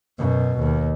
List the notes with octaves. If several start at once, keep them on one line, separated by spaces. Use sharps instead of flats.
F#2 B2
D#2